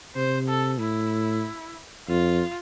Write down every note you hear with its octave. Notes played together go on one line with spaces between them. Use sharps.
C3 C5
A4
A2 E4
F2 F4